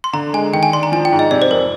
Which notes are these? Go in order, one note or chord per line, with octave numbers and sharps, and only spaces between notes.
C6
D3 A#5
G#3 G#5
D#3 G5
G#5
D4 C6
A#5
F3 G#5
G5
G#2
D#5
C3 D5
C5
F2 A#4